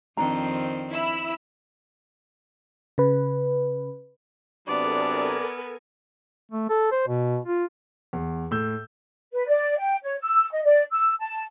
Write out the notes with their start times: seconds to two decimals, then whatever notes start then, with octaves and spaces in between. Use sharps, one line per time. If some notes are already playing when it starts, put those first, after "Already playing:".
0.17 F2 D#3 C4 D4 A#5
0.91 E4 B5 E6
2.98 C#3 B4
4.67 C3 F#3 B3 D4 A4 A#4 D5 G#5
6.52 A3
6.69 A4
6.92 C5
7.07 B2
7.45 F4
8.13 E2
8.51 A2 E6 G6
9.32 B4
9.47 D5
9.78 G5
10.03 C#5
10.21 E6
10.52 D#5
10.64 D5
10.91 E6
11.20 A5